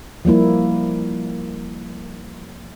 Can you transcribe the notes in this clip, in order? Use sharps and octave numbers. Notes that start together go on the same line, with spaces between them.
F3 G3 A#3 E4